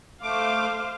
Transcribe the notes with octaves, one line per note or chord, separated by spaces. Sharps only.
A3 C5 F5 D6